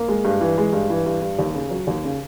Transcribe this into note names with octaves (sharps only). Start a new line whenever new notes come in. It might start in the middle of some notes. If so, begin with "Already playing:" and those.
Already playing: A#3
G#3
G2
E3
G#3
G2
E3
G2
G2
D#2
C#3
F#3
D#2
C#3